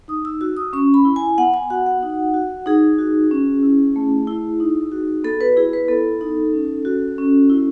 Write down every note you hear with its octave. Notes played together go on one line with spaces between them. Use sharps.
D#4 D#6
E6
F#4 E6
D#6
C#4 C#6
B5
E4
G#5
B3 F#5
G#5
F#4 F#5
F#5
D#4
F#4
D#4 G#4
F#4
C#4
E4
A3
E4
D#4
F#4
B3 A4
B4
E4 G#4
B4
B3 A4
D#4
C#4
F#4
C#4
E4